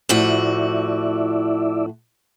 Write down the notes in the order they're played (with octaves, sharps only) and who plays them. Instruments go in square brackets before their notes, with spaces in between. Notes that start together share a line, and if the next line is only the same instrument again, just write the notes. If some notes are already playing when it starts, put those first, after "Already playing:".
[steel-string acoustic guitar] A2 F3 F#4 [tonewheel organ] E4 D5 E5